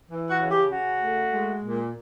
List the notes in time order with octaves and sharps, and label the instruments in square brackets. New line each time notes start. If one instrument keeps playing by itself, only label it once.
[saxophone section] E3
F#4
C#3
G4
C#3 F#4
A3
G#3
A#2